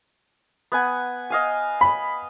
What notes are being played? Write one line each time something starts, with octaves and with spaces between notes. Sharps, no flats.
B3 F#5 G#5
D#5 F5 G#5
B5